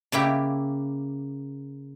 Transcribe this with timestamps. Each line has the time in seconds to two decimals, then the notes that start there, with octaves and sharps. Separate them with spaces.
0.12 C#3 A#3 E4 G4